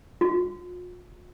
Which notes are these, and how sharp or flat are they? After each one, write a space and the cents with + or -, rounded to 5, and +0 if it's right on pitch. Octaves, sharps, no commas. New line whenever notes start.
F4 +40